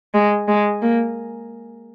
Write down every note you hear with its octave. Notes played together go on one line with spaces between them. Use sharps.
G#3
G#3
A#3